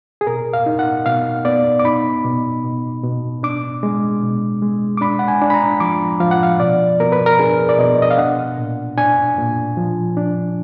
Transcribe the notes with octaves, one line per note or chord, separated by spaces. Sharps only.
G#4
B2 A#4
F5
D#4
F#5
B2 F5
B3 D5
D6
D#4 B5
B2
B2
B2
D4 D6
G#3
B2
G#3
D6
D4 B5
F#5
G#5
D4
B5
A#5
F3 D6
F3 F5
F#5
F5
B2 D5
B2 A#4
B4
A#4
D4 G#4
D5
B2 D#5
D#5
F5
D4 F#5
A#2
D4 G#5
A#2
F3
D4